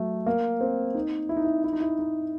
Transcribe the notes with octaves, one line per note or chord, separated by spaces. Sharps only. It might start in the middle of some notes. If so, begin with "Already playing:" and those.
Already playing: F#3 A3
A#3
C4
D#4
E4
D#4
E4
E4
D#4
E4
D#4